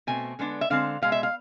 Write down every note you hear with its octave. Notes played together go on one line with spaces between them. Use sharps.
B2 A3 C4 G#5
D3 G#3 B3 D4
E5
D3 G#3 C4 F5
B2 G#3 B3 F5
E5
F5